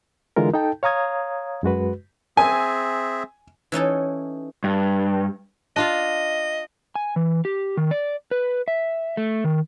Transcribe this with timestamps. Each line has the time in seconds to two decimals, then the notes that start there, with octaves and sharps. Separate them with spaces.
0.36 D3 E3 G#3 F4 A#4
0.54 D#4 A4 G5 A5
0.83 C#5 F5 A#5 D#6 G#6
1.63 F#2 G#3 F#4 B4
2.37 C4 G#4 E5 G#5
3.72 E3 C#4 D#4 A4
4.64 G2
5.76 D4 F4 D#5 F5
6.96 G#5
7.16 E3
7.45 G4
7.77 D#3
7.91 D5
8.31 B4
8.68 E5
9.17 A3
9.44 D#3